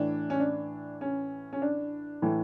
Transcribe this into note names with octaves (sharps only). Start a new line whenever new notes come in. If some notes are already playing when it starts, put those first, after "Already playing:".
Already playing: A2 E3 D4
C#4
D4
C#4
C#4
D4
A2 E3